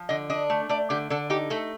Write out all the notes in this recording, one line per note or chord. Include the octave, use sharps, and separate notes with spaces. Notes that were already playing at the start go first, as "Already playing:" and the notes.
Already playing: F3
D3 D#5
D4 D#5
A3
A3 D5
D3 G4
D3 A4
D#4 G4
A3 A4